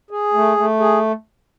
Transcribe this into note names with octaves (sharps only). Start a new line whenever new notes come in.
G#4
A3
A3
G#4